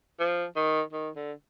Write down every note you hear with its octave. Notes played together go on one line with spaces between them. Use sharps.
F3
D#3
D#3
D3